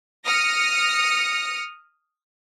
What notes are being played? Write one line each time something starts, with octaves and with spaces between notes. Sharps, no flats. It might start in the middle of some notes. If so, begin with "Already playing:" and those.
D#6 F6 A#6 C#7